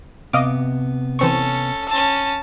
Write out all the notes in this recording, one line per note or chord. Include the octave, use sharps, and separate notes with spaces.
C3 B3 D#5 F5 D6
E3 C4 C#4 A4 C#6
C#4 A5